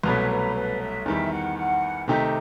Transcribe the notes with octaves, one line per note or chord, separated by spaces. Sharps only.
C2 B2 F#3 A3 B4
B4
B4
E5
E2 D#3 G3 E5
F#5
F#5
C3 D#3 A3 D#4 G4 E5